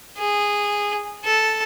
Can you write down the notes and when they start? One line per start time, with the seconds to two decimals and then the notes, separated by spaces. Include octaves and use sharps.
0.18 G#4
1.25 A4